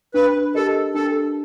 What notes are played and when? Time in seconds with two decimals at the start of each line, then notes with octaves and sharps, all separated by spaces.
0.14 D4 B4
0.55 G4 A4 A#4 D#5
0.94 D4 A4